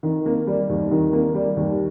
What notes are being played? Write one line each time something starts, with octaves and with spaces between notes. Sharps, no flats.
D#3
A#3
G3
D#2
D#3
A#3
G3
D#2